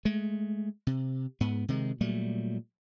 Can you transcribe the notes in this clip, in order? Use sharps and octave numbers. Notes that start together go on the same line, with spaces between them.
G#3 A3
C3
G#2 B3
C3 D#3 G#3
A#2 F#3 G3 A3